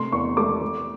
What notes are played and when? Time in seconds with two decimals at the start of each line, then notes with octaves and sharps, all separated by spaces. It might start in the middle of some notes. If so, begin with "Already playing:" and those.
Already playing: C3 A3 C6
0.12 E2 C#6
0.37 A3 D6
0.61 A3